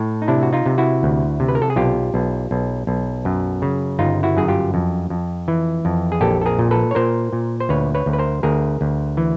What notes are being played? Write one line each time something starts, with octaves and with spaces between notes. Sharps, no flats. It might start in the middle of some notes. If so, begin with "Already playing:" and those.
Already playing: A2
D#4
C3 D4 E4
F#4
D#4 F4
C3
E4 F#4
D2
C3
B4
A#4
A4
G#4
B1 F4 G4
B1
B1
B1
F#2
C#3
G1 D#4 F4
E4 F#4
F#2 G#4
F4 G4
F2
F2
E3
F2
G#4
A#1 G4 A4
A4
G#4 A#4
A#2
A4 B4
C#5
A#2 A#4 C5
A#2
C5
D2 B4 C#5
B4 C#5
D2
B4
A#4 C5
D2 G#4 A#4
D2
E3